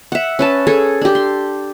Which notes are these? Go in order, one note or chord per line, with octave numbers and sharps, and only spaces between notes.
E5 F#5
C#4 B4 A5
G#4 A4 G#5
D4 G4
C6